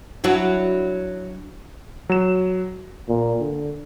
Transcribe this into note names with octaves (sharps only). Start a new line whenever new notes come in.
F#3 D4 E4
F#3 E7
A#2
D3